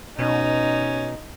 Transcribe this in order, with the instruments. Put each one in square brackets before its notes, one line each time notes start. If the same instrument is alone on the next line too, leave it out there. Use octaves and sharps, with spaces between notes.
[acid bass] B2 [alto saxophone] C#4 [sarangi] D#4